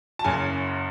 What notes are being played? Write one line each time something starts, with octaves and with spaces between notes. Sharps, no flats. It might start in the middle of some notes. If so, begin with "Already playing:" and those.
A5
F#1 F#2 C#3 G#5